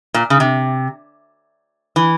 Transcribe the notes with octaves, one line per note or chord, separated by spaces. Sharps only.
A#2
C#3
C3
E3